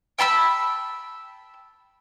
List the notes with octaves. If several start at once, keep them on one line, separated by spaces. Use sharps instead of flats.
G5 A5 B5 E6